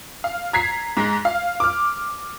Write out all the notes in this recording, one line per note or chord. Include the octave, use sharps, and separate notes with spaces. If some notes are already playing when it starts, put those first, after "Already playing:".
F5
A#5 G#6 B6 C7
G#2 G#3
F5
D6 F6